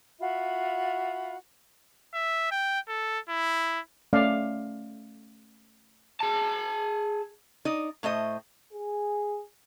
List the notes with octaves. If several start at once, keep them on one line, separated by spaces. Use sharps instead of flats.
F4 F#4 E5 B5
E5
G5
A4
E4
A3 C#4 D5 F5
G#4 A5
D#4 D5 D#5
A2 A3 C5 D#5
G#4